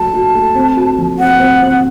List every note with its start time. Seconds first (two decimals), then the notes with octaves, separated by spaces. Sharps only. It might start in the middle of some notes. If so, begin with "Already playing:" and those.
Already playing: F#3 A3 A5
0.13 F#4
0.34 A3
0.55 C4
0.76 F#4
0.98 F3
1.19 C4 F#5
1.40 C4
1.62 C4